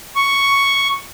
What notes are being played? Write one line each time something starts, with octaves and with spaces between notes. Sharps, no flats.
C#6